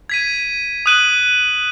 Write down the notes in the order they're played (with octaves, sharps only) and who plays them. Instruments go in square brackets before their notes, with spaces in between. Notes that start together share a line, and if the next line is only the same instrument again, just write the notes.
[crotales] G#6 B6 D#7
D#6 F#6 D#7 F#7